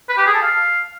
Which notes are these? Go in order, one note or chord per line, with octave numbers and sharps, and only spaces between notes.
B4
G4
G#4
A4
F5